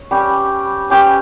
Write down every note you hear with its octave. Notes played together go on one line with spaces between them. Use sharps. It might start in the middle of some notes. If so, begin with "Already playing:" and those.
Already playing: C#5
G3 C#4 G4 B4
C#4 G4 B4